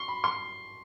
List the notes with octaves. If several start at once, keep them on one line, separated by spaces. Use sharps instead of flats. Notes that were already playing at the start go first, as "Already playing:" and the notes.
Already playing: C6 C#6
B5
C6